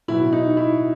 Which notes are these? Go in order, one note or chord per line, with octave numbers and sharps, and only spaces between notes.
B2 F#3 B3 E4
D#4
E4